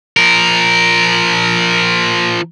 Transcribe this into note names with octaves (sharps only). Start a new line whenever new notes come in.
F3 A#4